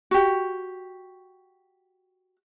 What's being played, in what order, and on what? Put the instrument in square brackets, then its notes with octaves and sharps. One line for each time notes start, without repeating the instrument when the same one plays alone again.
[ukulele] F#4 G4